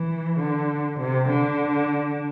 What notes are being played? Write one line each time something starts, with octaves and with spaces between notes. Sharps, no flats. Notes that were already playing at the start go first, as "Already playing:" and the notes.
Already playing: E3
D3
C3
D3